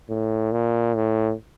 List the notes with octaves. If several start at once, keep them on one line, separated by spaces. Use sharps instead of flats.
A2
A#2
A2